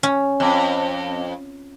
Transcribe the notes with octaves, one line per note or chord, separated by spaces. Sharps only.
C#4
F2